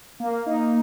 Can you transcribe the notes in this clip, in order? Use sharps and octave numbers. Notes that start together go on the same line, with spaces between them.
A#3
D#4